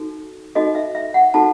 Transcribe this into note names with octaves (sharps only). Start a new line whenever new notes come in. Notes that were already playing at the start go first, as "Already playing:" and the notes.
Already playing: D#4 F#4 A4
D#4 F#4 A4 D#5
E5
E5
F#5
D#4 F#4 A4 A5